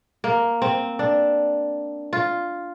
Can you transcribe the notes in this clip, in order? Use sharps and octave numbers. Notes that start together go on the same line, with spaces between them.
A#3
C4
D4
F4